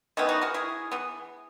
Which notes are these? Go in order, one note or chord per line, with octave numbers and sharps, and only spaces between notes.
D#3 G#3 B3 C#4 E4
D#4 F#4
F#4 A#4
E4 G#4
E3 B3